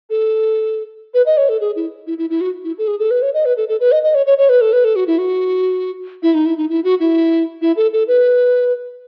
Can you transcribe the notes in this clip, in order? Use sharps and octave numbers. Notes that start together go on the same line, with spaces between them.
A4
B4
D#5
C#5
A4
G#4
E4
E4
E4
E4
F#4
E4
A4
G#4
A4
B4
C#5
D#5
B4
A4
A4
B4
D#5
D#5
C#5
C#5
C#5
B4
A4
B4
A4
F#4
E4
F#4
E4
D#4
E4
D#4
E4
F#4
E4
E4
A4
A4
B4